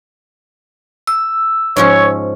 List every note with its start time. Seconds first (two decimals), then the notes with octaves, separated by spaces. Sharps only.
1.07 E6
1.76 G#2 F3 C#4 C#5